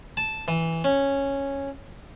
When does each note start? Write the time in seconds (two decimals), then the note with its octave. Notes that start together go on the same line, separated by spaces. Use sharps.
0.17 A5
0.48 E3
0.84 C#4